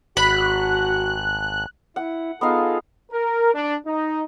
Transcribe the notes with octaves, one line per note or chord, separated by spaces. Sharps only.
G#1 F#4 B5 F#6
E4 F#5
B3 D#4 F4 G#4 A4 F5
A#4
D4
D#4